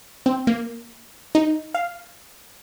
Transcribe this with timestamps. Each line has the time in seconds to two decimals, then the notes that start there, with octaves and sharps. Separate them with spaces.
0.26 C4
0.47 A#3
1.35 D#4
1.74 F5